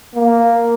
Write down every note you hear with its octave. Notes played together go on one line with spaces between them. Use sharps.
A#3